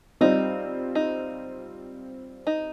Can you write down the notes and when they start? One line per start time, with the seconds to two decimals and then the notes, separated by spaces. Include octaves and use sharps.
0.21 G3 C4 D#4 F4
0.95 D#4
2.47 D#4